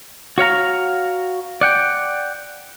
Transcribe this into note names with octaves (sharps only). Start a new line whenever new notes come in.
F#4 C#5 F5 A#5
D5 F#5 G5